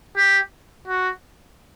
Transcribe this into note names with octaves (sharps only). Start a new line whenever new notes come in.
G4
F#4